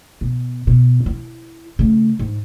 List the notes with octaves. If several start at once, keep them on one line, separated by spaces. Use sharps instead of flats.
B2
B2
E4
C#3 A3
G#2